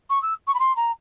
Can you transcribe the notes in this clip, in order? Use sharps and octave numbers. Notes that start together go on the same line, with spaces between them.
C#6
E6
C#6
B5
C6
A#5